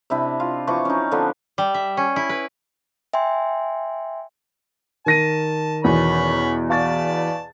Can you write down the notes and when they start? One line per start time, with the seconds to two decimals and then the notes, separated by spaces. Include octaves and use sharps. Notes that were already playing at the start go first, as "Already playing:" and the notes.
0.10 C3 D4 E4 D#5
0.40 F4
0.67 E3 F3 C#6 D6
0.85 C#4 D#4
1.11 D3 F3 B3 D4
1.58 G3
1.74 E5
1.97 C#4
2.16 E4
2.29 B4
3.14 E5 G5 G#5 C6
5.06 D#3 A5 A#6 D#7
5.84 E2 B2 C#4 B5 C#6
6.70 B4 D5 F5 A5 C#6 A6